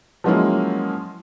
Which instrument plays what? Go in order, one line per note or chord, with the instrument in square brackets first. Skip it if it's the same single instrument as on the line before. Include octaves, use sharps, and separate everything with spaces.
[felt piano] F3 F#3 G#3 A#3 C#4 E4